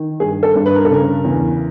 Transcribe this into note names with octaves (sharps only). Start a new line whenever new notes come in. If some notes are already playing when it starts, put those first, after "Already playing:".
Already playing: D#3
G2 G#4
A4
G2
B4
A#4
A4
C#3 A#4
E2